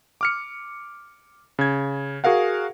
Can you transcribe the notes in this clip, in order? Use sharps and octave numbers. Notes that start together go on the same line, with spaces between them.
D6 F6 C#7
C#3 G#6
F#4 G#4 A#4 F5 F#5